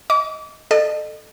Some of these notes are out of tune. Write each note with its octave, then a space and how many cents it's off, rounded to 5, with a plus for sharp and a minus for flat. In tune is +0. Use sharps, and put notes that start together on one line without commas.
D#5 +10 D6 -35
A4 +0 D#5 -40